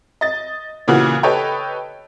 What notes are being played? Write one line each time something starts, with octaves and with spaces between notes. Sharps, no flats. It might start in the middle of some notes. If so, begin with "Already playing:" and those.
D#5 A6
A#2 C#3 E3 B3 F#4
G4 A4 B4 C#5 D#5 G5